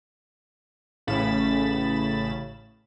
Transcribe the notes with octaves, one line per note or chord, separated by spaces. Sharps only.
A1 A2 C#3 B5 A6 E7